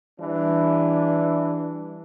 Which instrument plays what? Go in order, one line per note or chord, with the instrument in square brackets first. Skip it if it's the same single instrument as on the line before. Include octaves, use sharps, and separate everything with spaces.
[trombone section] E3 G3 D4